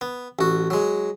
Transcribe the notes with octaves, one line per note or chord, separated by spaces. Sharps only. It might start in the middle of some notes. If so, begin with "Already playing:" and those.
B3
A1 F#4
F#3 G#3